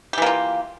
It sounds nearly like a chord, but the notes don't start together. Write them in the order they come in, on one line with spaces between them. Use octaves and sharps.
G4 E3 A#3 F4